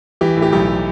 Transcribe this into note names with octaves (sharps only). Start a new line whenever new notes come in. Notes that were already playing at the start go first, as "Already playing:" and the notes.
E3 G4
A2
G4
B1 G4